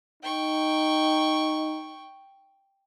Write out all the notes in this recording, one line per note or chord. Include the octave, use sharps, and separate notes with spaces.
D#4 G5 C#6